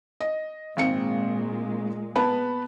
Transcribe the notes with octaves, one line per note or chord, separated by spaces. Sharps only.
D#5
G#1 A#2 G#3 C4 C#7
B3 B4 A5